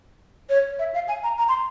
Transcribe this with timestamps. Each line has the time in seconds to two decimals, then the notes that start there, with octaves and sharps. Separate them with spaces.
0.49 C#5
0.79 E5
0.94 F5
1.08 G#5
1.24 A#5
1.38 A#5
1.49 C6